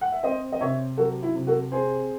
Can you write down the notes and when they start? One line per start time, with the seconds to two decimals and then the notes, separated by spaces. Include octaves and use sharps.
0.01 F#5
0.12 E5
0.23 C4 C5 D#5
0.52 D#5
0.60 C3 C#5 E5
0.97 F#3 F#4 A4
1.23 E4
1.35 C3
1.47 F#4 A4
1.72 C4 G#4 C5